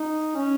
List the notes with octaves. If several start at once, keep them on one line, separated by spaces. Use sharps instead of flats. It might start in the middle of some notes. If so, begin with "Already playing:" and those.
Already playing: D#4
C#4